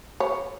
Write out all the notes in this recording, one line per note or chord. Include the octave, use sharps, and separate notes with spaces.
C#5